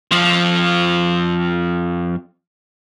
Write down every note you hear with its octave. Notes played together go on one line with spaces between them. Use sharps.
F2 F3